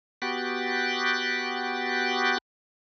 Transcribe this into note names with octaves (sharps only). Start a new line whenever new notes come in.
B3 F#4 G4 G5 F#6 A6